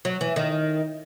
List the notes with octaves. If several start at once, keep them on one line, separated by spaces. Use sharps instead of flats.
F#3
E3
D#3